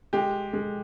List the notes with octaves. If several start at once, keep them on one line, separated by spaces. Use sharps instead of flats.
G#3 G4
G#3